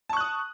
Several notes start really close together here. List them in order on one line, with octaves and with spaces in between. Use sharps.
A5 C#6 F#6 D#6